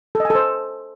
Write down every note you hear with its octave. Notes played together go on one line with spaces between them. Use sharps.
A4
D#5
G#5
A4
C5